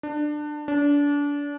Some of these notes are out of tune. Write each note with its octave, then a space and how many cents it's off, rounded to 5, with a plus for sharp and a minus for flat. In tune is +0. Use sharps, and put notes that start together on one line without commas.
D4 +20
D4 -30